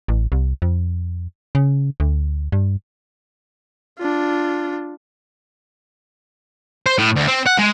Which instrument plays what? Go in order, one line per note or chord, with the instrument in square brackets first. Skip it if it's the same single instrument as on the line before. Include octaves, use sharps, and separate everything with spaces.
[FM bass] A1
C2
F2
C#3
D2
G2
[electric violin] D4 F4
[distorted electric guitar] C5
A2
D2
C4
F#5
G#3